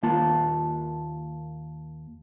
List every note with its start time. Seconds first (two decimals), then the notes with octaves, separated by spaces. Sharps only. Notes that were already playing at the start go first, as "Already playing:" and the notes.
0.03 D#2 A#3 F4 A5